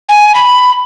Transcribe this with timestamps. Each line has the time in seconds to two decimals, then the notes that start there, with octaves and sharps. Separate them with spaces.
0.09 G#5
0.35 B5